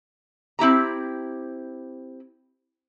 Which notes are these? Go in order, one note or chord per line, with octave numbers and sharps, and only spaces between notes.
C4 E4 G4 A#5